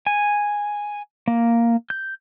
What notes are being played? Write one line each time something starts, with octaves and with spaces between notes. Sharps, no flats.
G#5
A#3
G6